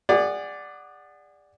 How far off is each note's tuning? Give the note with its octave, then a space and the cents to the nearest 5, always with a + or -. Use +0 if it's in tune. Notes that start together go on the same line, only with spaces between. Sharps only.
G#4 -35 D5 +0 F#5 +0